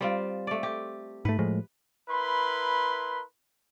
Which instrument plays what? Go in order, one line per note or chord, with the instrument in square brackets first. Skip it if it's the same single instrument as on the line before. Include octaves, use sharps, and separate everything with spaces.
[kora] G3 C4 F4
A3 D5
G4
[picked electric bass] G#2 A3 [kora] B4
[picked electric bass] A2 F3 G#3
[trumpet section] E4 A#4 B4 B5 C6